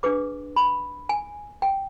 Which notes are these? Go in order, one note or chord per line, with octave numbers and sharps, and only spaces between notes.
D4 G#4 B4 D6
B5
G#5
G5